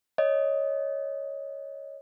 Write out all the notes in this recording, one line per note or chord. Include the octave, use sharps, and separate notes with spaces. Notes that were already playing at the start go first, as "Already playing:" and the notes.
C#5 D#5